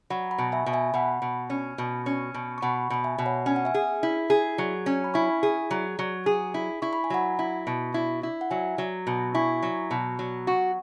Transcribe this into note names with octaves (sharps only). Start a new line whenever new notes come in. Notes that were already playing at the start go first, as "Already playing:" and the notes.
F#3 F#5 B5
F#5 B5
B2
E5 G#5
B2
E5 G#5
B2 F#5 B5
B2
C#4
B2
C#4
B2
C#6
B2 F#5 B5
B2 B5
E5 G#5
B2
C#5 F#5
C#4 G#5
F#5
E5 G#5
G#4
E4
G#4
F#3
C#4
B5
E4 G#5 C#6
G#4
F#3
F#3
G#4
E4
E4 C#6
B5
G#5
F#3 F#5 B5
E4
B2
E4
E4
F#5
F#3 E5 G#5
F#3
B2
E4 G#5 C#6
F#3
B2
F#3
F#4